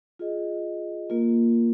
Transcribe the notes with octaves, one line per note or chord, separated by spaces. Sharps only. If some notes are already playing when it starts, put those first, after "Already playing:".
F4 G#4 D#5
A#3 F4 A#4